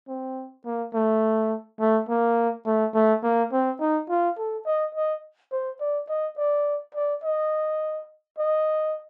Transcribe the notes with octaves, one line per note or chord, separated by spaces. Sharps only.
C4
A#3
A3
A3
A#3
A3
A3
A#3
C4
D#4
F4
A4
D#5
D#5
C5
D5
D#5
D5
D5
D#5
D#5